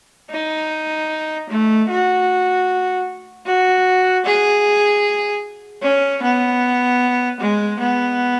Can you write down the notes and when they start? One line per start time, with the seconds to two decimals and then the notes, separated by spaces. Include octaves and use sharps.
0.31 D#4
1.49 A3
1.89 F#4
3.46 F#4
4.25 G#4
5.82 C#4
6.22 B3
7.40 G#3
7.79 B3